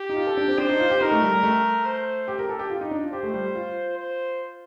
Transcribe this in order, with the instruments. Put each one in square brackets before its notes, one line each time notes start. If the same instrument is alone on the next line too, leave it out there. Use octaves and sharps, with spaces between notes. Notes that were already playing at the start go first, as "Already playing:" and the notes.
Already playing: [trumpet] G4
[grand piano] D#4
F4
A4
D4
C4
[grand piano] D4 [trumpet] C5
[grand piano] D#4
F4
G4
[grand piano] D#4 [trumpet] A#4
[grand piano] A3
G3
G3
A3
[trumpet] C5
[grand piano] G4
A#4
A4
G4
F4
D#4
D4
F4
[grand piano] G4 [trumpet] C5
[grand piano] A3
G3
F4
[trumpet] C5